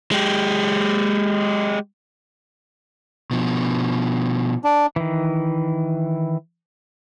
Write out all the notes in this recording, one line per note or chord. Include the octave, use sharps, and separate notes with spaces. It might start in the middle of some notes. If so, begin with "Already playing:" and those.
G#3 G4
B2 F3
D4
D#3 E3